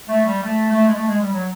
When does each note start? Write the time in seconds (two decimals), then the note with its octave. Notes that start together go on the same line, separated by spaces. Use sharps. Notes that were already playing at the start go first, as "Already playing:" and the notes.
0.08 A3
0.26 G3
0.43 A3
0.70 A3
0.88 G#3
0.96 A3
1.08 G#3
1.21 G3
1.34 F#3